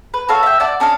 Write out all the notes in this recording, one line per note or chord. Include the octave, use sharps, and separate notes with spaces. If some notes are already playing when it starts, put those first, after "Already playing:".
B4
F#4 A4 C#5 F5
E5 G5
D5 F#5 A5 D6
C#4 D4 D#5 F5